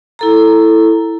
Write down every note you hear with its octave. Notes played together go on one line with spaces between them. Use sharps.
E4 A4 A#5